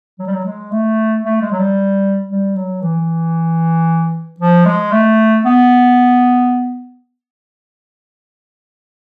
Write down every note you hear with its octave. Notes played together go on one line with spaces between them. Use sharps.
F#3
G3
F#3
G#3
A3
A3
G#3
F#3
G3
G3
F#3
E3
F3
G#3
A3
B3